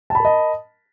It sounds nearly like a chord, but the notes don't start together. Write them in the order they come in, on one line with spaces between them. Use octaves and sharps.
A5 B5 A#4 D#5